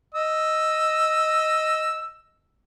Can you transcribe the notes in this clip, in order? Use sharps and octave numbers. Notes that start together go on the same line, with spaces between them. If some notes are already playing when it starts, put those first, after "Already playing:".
D#5 E6